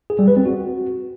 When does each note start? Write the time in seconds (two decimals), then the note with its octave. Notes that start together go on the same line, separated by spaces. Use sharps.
0.10 G#4
0.19 G3
0.28 B4
0.37 C4
0.45 F#4